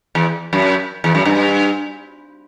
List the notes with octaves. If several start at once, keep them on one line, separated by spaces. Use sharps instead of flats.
E2
F#2
E2
F#2
G2